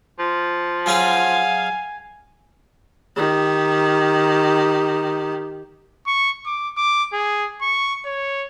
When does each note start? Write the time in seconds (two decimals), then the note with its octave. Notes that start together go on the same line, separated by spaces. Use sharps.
0.19 F3
0.86 F#3 C#4 G#4 F5 G#5
3.17 D#3 G4
6.07 C#6
6.46 D6
6.77 D6
7.13 G#4
7.62 C#6
8.06 C#5